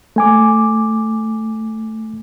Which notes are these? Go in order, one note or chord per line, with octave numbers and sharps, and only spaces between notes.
A3 G#5 D6